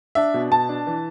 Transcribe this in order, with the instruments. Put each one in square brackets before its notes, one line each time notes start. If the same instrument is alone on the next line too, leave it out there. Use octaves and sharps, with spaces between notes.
[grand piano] D4 E5
B2
B2 A5
D4
E3